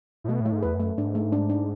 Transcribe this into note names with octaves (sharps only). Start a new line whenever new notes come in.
A2
B2 A3
A2 A3
G#2
E2 B4
F#2
A3
G#2 D4
A3
D4
D4